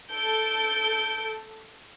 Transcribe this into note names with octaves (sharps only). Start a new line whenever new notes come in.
A4 G6 D7